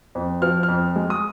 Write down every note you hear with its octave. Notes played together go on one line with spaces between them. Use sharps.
F2
F3 F6
F6
F2
G#3
D#6